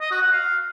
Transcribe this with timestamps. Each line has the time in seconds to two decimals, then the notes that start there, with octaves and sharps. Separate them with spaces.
0.01 D#5
0.11 F#4
0.22 F#5
0.33 F5